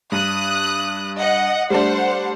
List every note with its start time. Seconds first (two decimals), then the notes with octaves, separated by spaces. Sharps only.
0.12 G2 D#6 F#6
1.18 D#5 F#5
1.70 G3 A3 D4 C5 F#5